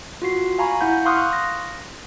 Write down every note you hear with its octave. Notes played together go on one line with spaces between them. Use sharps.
F4 F#4 C7
F5 G#5 A#5 B5 C#6
E4 F#5 B5 G6
F5 C6 C#6 D#6 F6 F#6
A#6